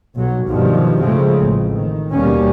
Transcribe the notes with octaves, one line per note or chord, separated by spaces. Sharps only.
B1 F#3
B1 G2 B2 D#3 F3 G3
C#3 F3 G#3 A3 C4
A1
D#3
D#2 B2 G3 A#3 C#4